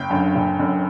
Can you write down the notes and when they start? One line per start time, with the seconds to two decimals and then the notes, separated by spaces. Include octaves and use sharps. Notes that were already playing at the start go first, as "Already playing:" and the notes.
Already playing: F#1 G5
0.10 F#2 D3
0.35 F#1
0.59 F#2 D3